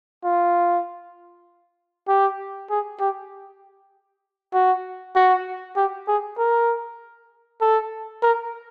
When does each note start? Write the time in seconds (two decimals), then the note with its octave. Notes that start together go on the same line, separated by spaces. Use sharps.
0.24 F4
2.08 G4
2.70 G#4
3.00 G4
4.54 F#4
5.16 F#4
5.76 G4
6.08 G#4
6.38 A#4
7.61 A4
8.23 A#4